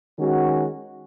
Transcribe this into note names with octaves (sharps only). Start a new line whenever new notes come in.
D#3 G#3 C#4 F#4